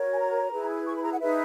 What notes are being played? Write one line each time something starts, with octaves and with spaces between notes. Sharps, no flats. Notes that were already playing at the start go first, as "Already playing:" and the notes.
Already playing: F#4 A#4 C#5
G#5
A#5
E4 G#4 B4
C#6
B5
A#5
F#5
D#4 G#4 B4 E5